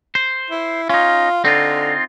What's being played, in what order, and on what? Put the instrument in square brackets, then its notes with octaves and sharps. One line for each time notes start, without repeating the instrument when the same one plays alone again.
[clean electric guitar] C5
[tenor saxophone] E4
[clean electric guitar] C#4 D#4 [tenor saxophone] F4
[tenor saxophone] D3 [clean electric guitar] C4 D#4 F4